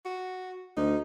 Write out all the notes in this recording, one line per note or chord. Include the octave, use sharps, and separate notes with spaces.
F#4
D2 D#4